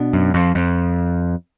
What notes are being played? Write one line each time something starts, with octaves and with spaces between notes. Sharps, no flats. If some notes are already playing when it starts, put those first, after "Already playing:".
Already playing: B2 D4
F#2
F2
F2